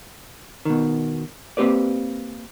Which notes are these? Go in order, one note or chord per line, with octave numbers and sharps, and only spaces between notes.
B2 D#3
A#3 C4 G4 B4 D5